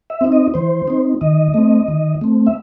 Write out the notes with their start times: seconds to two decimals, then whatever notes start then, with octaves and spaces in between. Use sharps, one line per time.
0.10 E5
0.21 C4 D#4
0.32 D#5
0.54 E3 C5
0.88 C4 D#4
1.21 D#3 D#5
1.54 A3 C4
1.88 D#3
2.21 A3 C4
2.47 E5